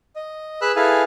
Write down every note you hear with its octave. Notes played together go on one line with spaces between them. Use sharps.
D#5
G#4 B4 B5 E6 F#6
E4 G#4 A4 B4 F5 G#5